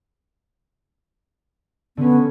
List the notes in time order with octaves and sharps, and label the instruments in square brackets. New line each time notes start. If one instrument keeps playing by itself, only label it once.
[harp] D3 C#4 [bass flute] B3